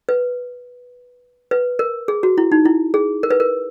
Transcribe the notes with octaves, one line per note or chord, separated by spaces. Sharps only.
B4
B4
A#4
G#4
F#4
E4
D#4
E4
G#4
A#4
B4
A#4